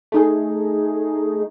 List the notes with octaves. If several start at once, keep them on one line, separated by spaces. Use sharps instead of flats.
A3 D#4 G#4